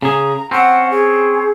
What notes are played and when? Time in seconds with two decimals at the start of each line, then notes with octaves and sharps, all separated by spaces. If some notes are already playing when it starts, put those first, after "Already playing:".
0.02 C#3 G#4 A#5
0.51 C4 C#4 F#5
0.91 G#4